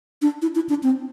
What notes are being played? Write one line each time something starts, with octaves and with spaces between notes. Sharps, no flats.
D4
E4
E4
D4
C4